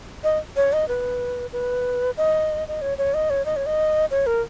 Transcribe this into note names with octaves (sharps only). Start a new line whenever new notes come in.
D#5
C#5
D#5
B4
B4
D#5
D#5
C#5
C#5
D#5
C#5
D#5
C#5
D#5
C#5
A#4